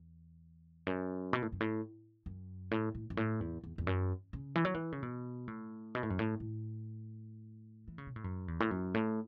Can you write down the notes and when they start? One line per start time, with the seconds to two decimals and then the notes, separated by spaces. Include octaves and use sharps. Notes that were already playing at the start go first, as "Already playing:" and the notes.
Already playing: E2
0.87 F#2
1.33 B2
1.42 A2
1.52 F#2
1.60 A2
2.26 F#2
2.71 A2
2.95 A2
3.10 F#2
3.17 A2
3.41 E2
3.64 E2
3.78 E2
3.87 F#2
4.33 C#3
4.55 E3
4.65 F#3
4.74 E3
4.92 C#3
5.03 B2
5.48 A2
5.95 B2
6.03 A2
6.10 F#2
6.19 A2
6.40 A2
7.88 E3
7.98 C#3
8.07 B2
8.16 A2
8.24 F#2
8.48 E2
8.60 A2
8.71 F#2
8.94 A2